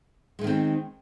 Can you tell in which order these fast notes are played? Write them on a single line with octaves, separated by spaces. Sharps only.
G#3 A3 D#3 C4